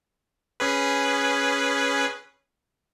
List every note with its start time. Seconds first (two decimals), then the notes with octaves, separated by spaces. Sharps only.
0.60 C#4 G#4 B4